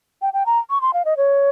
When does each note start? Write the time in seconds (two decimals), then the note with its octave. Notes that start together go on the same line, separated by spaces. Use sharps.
0.22 G5
0.33 G5
0.46 A#5
0.70 C#6
0.81 C6
0.93 F5
1.05 D#5
1.17 C#5